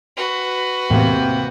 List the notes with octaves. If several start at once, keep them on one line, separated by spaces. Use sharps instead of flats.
F#4 B4
E2 A2 C3 A#3 B3 G5